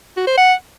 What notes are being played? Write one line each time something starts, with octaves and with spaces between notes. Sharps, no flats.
F#4
C5
F#5